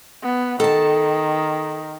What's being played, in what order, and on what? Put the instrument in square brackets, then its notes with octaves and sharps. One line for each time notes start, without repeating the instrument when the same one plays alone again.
[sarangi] B3
[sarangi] D#3 [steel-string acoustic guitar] A4 A5